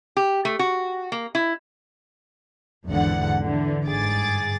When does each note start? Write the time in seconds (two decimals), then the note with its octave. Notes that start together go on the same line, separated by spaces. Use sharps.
0.17 G4
0.45 A3
0.59 F#4
1.12 A#3
1.35 E4
2.88 G#1 E2 D3 F#5
3.44 D3 E3
3.85 G1 G#2 G#4 D6 A6